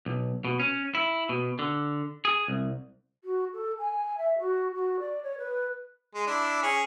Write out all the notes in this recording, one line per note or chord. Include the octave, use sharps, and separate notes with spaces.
B1
B2
C#4
E4
B2
D3
G#4
C2
F#4
A4
G#5
E5
F#4
F#4
D5
C#5
B4
G#3
D4 E4
C#4 G#4